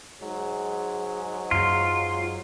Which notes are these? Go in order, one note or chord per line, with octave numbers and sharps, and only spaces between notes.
G#2 F#3 G#3
F#2 F4